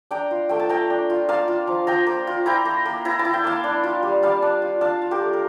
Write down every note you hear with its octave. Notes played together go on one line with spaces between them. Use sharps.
D4 G5 A#5
F4
A3 G5
A5
A3 G5 A#5
D4
F4
A#3 F5 A5
F4
F3
F3 G5 A#5
A#3
F4
E4 G5 A#5
A#3
A#3
E4 A#5
A5
E4
G5
A#3 F5 A5
D4
F4
G3
G3 F5 A5
D4
F4
D4 F5 A5
F4
G4 A#4
A3
A#4